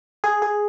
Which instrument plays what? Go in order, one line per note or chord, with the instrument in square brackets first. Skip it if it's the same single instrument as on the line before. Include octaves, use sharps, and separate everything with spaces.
[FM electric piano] G#4
G#4